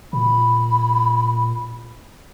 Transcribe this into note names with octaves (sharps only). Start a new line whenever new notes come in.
A#2 B5